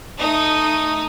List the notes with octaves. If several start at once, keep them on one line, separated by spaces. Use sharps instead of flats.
A3 D#4 D#6